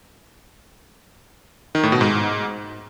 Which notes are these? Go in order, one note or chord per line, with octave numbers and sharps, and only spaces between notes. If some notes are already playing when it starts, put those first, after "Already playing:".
D#3
A2
B2
G#2